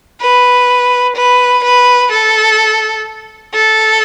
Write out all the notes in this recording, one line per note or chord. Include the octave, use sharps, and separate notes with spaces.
B4
B4
B4
A4
A4